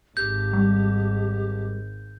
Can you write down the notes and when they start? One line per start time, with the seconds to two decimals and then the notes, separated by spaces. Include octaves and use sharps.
0.17 G#1 G#2 G4 G6
0.53 G3